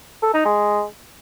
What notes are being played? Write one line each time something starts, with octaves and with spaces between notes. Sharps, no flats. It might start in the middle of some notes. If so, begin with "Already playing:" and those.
A4
D#4
G#3